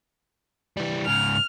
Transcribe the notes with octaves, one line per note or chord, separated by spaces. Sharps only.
E3 G3
G#2 C#3 F6